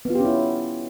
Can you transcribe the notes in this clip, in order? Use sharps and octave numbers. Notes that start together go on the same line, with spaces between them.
B3 C#4 E4 F4 G4